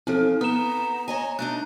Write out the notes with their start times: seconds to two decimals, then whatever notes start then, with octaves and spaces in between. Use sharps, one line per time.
0.07 E2 F3 C4 A4
0.41 B3 A#5 D#6 E7
1.08 C#5 D#5 G#5
1.39 A3 D4 D#4 F#6